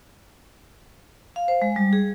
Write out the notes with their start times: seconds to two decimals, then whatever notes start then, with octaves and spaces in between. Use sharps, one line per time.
1.36 F5
1.48 C5
1.62 G#3
1.76 G3
1.93 G#4